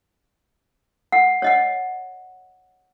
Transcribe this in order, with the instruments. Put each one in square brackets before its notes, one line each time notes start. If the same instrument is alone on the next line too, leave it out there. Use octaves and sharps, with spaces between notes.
[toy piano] F#5
C#5 D#5 F#5